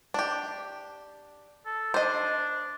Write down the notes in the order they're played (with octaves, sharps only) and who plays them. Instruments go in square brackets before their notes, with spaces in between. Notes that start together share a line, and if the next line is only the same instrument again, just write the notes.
[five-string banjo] D4 G4
[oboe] A4
[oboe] D4 [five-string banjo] C5 D#5